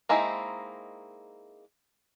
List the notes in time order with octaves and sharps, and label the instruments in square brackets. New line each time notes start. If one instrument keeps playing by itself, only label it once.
[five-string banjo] G#3 A#3 C4 D#4 E4